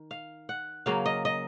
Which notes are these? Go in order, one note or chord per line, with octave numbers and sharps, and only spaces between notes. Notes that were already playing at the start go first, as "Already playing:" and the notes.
Already playing: D#3
F5
F#5
C#3 F#3 A#3 F5
D#5
D#5